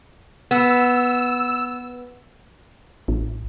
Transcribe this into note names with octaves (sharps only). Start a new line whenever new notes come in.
B3 E6
A1